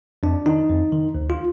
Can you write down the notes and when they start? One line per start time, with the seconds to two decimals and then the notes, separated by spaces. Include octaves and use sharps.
0.23 F2 D4
0.46 D#3 D#4
0.69 F2
0.92 D#3
1.15 D2
1.30 F4